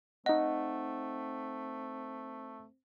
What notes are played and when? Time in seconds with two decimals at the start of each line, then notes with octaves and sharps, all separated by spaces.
0.26 A3 C4 D#4 D#5 F#5